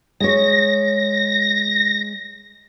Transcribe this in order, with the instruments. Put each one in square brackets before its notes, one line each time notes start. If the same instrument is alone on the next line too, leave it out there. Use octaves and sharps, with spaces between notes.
[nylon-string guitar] G#3 C#5 [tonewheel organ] A#6